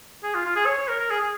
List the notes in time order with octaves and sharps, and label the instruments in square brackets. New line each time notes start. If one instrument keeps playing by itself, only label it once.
[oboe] G#4
F4
F4
G#4
C#5
C#5
A#4
A#4
G#4
G#4